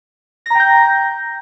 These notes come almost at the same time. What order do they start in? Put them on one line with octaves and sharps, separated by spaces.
A#6 A#5 G5 G6